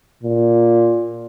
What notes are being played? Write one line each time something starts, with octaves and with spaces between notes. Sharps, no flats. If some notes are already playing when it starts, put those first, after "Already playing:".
A#2